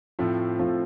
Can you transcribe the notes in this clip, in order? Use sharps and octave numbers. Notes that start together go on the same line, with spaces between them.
A2 F3 A3 C4 F4
A2 F3 A3 C4 F4